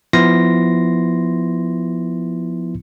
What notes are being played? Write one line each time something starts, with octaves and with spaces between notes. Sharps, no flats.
F3 B3 E4 C6 A#6